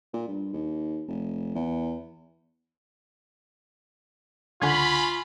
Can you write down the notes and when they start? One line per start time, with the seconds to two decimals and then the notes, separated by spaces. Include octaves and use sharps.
0.13 A#2
0.28 G2
0.53 D#2
1.08 F1
1.55 E2
4.62 C#2 D3 F4 F#5 G#5 B5 C#6 G#6